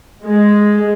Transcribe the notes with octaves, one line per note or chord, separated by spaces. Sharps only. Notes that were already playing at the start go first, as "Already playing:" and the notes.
G#3